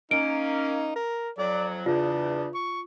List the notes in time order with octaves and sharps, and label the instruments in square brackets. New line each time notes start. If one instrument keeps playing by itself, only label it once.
[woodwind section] A#3 C#4 [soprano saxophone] D#4 [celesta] D7
[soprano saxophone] A#4
[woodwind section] F2 F#3 [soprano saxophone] D5
[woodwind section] E2 C#3 [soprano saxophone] D4 [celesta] F4
[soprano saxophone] C#6